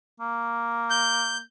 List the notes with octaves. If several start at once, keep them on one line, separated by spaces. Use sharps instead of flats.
A#3
G6